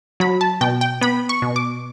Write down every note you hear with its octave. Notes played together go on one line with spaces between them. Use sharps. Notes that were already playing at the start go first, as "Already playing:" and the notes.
F#3 B5
A5
B2 G5
G5
B3 B5
C#6
B2
D6